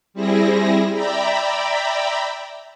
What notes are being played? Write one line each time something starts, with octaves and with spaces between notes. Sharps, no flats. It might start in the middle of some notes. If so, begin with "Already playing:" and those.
G3 C4 E4 G#4 A#6
D5 E5 G5 A#5 B5